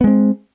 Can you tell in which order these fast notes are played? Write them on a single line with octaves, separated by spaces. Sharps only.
B3 G#3 C4